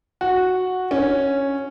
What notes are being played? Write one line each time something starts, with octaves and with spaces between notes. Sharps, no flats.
F#4
C#4